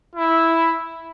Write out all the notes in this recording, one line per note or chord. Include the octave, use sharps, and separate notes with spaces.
E4